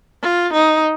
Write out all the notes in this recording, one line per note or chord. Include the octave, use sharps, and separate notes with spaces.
F4
D#4